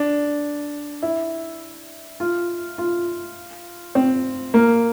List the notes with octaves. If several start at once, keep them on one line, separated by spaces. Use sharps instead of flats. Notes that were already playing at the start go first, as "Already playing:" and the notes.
Already playing: D4
E4
F4
F4
C4
A#3